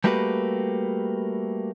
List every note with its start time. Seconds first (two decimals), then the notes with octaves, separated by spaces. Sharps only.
0.04 G3 A3 A#3 F#4 G4 B4